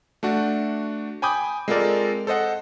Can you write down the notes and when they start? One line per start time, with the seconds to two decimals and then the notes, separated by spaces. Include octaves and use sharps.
0.23 A3 D4 F#4
1.22 G5 G#5 B5 D6 D#6 G6
1.68 G#3 C4 F4 A4 A#4 D5
2.27 A4 C5 D#5 F#5